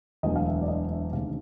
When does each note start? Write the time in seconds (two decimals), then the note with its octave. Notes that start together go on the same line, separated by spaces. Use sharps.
0.23 E1 D2 D3 F#3 D#5
0.36 F5
0.46 E5
0.62 D5
0.68 D#5
0.90 E5
1.12 D2 C3 D#3 G#3 C#4 F5